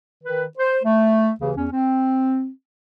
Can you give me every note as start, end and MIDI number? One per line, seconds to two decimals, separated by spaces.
0.23 0.45 51
0.23 0.45 71
0.58 0.77 72
0.84 1.32 57
1.41 1.53 39
1.41 1.53 49
1.41 1.53 52
1.57 1.68 40
1.57 1.68 61
1.72 2.49 60